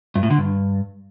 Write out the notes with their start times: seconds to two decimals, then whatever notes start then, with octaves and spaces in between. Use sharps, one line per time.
0.15 G2
0.23 A2
0.31 D3
0.38 G2